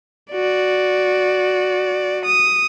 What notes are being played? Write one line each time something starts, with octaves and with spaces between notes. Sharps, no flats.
F#4 D5
D#6